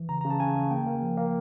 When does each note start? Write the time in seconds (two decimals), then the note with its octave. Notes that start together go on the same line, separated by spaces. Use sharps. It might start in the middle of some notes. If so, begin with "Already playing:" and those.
Already playing: E3
0.09 C#3 A#5
0.21 C#3 A#5
0.30 A5
0.40 C#3 G#5
0.55 C#3
0.71 A#3 G5
0.86 A#3
1.02 F3
1.17 A#3